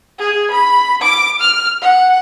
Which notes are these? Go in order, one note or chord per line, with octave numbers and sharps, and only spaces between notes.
G#4
B5
D6
F6
F#5